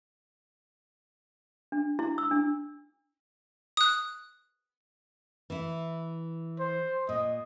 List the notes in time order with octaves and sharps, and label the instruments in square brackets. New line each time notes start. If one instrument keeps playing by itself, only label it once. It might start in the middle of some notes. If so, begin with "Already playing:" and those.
[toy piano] D4
E4
E6
D4
[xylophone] D#6 F#6
[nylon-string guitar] E3 E4
[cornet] C5
[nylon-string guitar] A#2 [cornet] D#5